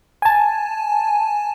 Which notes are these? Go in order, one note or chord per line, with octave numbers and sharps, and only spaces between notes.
G#5 A5